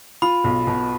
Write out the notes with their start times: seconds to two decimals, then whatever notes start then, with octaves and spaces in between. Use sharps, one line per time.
0.22 F4 B5
0.44 B1
0.67 B2